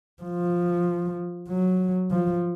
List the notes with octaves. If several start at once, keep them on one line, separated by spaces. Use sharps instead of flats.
F3
F#3
F3